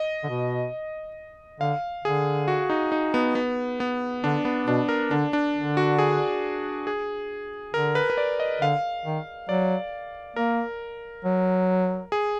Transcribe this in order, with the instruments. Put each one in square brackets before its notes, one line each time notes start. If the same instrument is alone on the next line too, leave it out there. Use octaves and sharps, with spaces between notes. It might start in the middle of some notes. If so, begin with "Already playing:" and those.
Already playing: [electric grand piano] D#5
[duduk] D3
B2
[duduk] D3 [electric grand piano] F5
[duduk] D3 [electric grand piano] G#4
[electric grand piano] F#4
D#4
D#4
B3
B3
B3
[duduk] D3 [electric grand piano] D4
[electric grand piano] B3
[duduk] B2 [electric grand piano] D4
[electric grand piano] A#4
[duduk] D3 [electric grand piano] D4
[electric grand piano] D4
[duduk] D3
[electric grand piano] F#4
G#4
G#4
[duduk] D3 [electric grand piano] A#4
[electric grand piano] B4
B4
D5
D#5
[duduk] D3 [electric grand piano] F5
[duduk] D#3
[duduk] F#3 [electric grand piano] D5
[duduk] A#3 [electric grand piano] A#4
[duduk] F#3
[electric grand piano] G#4